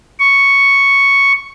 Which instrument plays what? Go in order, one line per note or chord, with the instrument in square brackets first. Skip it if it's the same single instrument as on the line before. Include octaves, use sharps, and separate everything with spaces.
[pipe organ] C#6